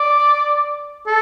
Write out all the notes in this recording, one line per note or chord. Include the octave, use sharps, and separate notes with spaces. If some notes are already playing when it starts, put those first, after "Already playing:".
Already playing: D5
A4